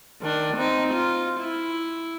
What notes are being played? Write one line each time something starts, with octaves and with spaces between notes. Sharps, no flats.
D#3 D4
C4 D#4
F4
E4